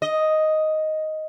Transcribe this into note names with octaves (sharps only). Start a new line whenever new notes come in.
D#5